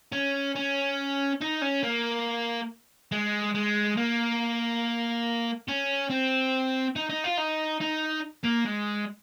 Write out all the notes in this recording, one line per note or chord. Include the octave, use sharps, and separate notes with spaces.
C#4
C#4
D#4
C#4
A#3
G#3
G#3
A#3
C#4
C4
D#4
D#4
F4
D#4
D#4
A#3
G#3